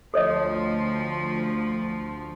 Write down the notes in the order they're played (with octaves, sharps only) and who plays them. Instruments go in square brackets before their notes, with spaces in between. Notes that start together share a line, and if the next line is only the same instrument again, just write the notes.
[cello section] D2 F3 [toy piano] A4 C#5 D#5